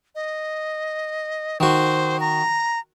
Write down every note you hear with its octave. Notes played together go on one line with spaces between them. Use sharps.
D#5
D#3 F#4 C5
A#5